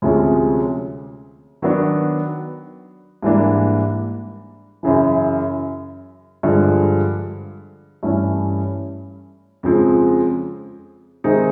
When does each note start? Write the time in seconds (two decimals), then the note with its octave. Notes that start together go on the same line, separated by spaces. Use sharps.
0.02 D2 C3 F3 G#3 C#4
1.62 D#3 F#3 B3 D4
3.22 G#2 E3 G3 A#3 D4
4.83 F#2 C#3 E3
6.43 G2 D3 F3 G#3
8.03 G2 E3 A3 C#4
9.63 F2 C#3 F3 G#3
11.24 C3 D#3 G#3 C4 D#4